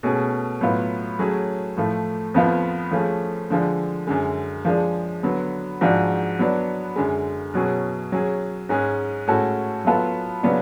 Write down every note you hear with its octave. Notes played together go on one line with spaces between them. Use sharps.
B2 A3 C#4 G#4
A2 F#3 B3 F4
F#3 A3 C#4 G#4
A2 F3 A3
F2 F3 B3 F4
F3 A3 C#4 G#4
D3 F3 G#3 D4
F#2 D3 G#3
F3 G#3 D4 G#4
D3 F#3 B3
G#2 F3 G#3 D4 F#4
F#3 B3 D4
F#2 D3 G#3
B2 F#3 C#4 G#4
F#3 C#4 G#4
G#2 G#3 C#4 G#4
A2 G#3 C#4 F#4 A4
F#3 B3 F4 A4
C#3 F#3 B3 D4